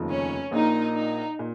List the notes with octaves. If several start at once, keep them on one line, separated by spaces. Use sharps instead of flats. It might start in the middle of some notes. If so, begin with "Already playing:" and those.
Already playing: F1 D#2 C#3 F3
C#4
A#1 A#2 A#3 D#4
D#4
A#2